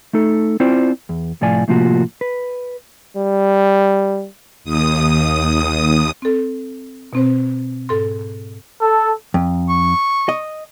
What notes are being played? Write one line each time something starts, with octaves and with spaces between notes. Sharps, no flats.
A3 D#4 A4
C4 E4 F4 C5 D5
E2
C2 A2 F3 F4 D5 G#5
A2 C3 F3 A#3 F4 F#4
B4
G3
D#2 D#6
C4 A4
B2 C4 C5
G#2 A4 C6
A4
F2
C#6
D#5